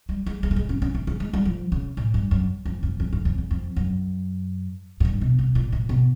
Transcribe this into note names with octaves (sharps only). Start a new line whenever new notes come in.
G3
G#3
G#3
A3
G#3
C#4
C#4
A3
G#3
G#3
G3
F3
C#3
A2
G2
F#2
F2
F2
F2
F#2
F2
E2
F2
F#2
G#2
G2
B2
B2
A#2
A2
B2